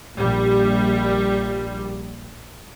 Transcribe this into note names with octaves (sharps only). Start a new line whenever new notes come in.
A#1 G3